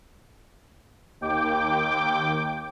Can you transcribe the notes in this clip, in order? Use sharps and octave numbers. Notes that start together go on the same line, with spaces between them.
D#2 G5 D6